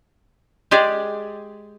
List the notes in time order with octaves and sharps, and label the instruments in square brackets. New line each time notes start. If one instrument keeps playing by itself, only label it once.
[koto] G#3 G4 G#4 D5